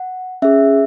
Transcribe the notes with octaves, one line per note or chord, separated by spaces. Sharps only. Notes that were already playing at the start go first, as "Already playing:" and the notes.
Already playing: F#5
C#4 G#4 E5